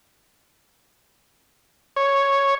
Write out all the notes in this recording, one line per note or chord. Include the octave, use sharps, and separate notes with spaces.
C#5